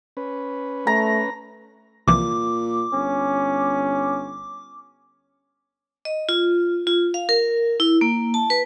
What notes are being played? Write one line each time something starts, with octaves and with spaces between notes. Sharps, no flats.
C#4 B4
A3 A#5
C2 A#2 E3 F3 D6
G1 C#4
D#5
F4
F4
F5
A#4
E4
A#3
A5
B4